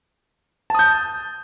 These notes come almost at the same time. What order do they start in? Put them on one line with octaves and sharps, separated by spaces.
A5 D#6 G6